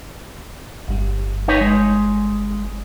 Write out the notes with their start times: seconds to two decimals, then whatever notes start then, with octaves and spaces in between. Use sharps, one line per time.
0.88 G1 G3
1.48 D#4 B4 C#5
1.61 G#3